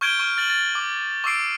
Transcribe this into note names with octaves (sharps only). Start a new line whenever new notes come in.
C#6 F6 G6 G#6 D7 G7
C#6 F6
F6 A6 F#7
A6
D6
C#6 D6 E6 C7 D7